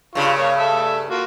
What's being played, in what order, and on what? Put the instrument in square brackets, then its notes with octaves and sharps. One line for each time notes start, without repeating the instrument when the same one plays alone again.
[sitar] G2 C#3 [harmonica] F4 C#6
[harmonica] A#3 C#5
A4 E5 E6
A#3 F4 F#4